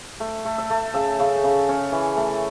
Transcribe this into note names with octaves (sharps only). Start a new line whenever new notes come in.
A3
A3
E5
A3
C#3 E5
C#3
C#3
C#4
E3
A3